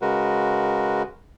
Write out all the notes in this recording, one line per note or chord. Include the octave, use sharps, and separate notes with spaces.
C#3 G#3 F#4 A#4 B4